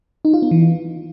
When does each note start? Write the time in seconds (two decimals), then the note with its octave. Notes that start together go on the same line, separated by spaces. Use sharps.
0.25 D#4
0.34 F4
0.42 B3
0.51 E3